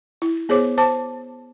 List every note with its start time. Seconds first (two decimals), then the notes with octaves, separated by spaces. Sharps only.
0.22 E4
0.49 B3 G#4 C5 C#5 D6
0.78 C5 A5 D6